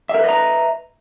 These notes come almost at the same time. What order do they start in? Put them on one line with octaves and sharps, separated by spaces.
E5 A#4 B4 D#5 A#5